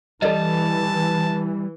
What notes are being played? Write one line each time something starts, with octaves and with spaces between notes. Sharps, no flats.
E3 G3 A4 D5 D#5 A5